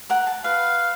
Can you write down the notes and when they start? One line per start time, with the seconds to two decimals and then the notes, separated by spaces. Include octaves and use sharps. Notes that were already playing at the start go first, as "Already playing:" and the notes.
0.09 A#4 F#5
0.27 A5
0.44 B4 F5